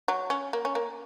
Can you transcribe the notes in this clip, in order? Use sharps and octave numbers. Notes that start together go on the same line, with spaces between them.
F#3
C#4
A#3
C#4
A#3